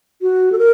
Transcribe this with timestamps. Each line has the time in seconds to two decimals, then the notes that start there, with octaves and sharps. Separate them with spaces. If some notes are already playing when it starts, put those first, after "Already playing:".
0.22 F#4
0.52 A4
0.58 A#4